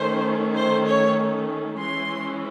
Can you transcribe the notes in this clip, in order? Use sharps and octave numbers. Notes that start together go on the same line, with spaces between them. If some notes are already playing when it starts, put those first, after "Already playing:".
Already playing: D#3 A3 C#4 C5
C5
C#5
E3 G#3 C#4 E4 C6